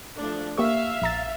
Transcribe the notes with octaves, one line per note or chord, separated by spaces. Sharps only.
F3 A3 D4
A#3 G4 E5 F5 C#6
A#1 A#5 A6